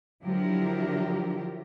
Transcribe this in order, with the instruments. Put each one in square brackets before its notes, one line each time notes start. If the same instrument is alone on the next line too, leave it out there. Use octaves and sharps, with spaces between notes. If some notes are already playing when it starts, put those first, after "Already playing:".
[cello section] D3 F3 F#3 E4 G4 A#4